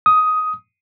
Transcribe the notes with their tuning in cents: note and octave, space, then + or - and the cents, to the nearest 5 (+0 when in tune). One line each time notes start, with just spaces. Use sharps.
D#6 +10